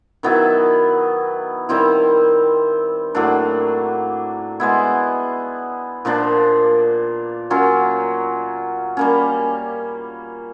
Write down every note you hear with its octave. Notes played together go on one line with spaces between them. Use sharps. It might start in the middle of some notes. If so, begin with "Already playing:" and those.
D#3 F#3 B3 E4
D#3 G3 C4 E4
A2 F#3 A#3 D4
G#3 B3 E4
A#2 F3 A#3 D4
F#3 A#3 C#4 F4
G3 A#3 C#4